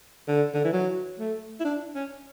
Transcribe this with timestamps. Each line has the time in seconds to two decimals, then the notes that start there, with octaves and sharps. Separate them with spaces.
0.28 D3
0.54 D3
0.64 E3
0.73 F#3
1.19 A3
1.60 E4
1.65 D4
1.95 C#4